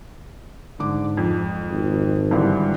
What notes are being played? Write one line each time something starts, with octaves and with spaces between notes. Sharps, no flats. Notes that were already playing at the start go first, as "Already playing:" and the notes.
G#2 D3 D6
F2
G#1
G2 D3 E3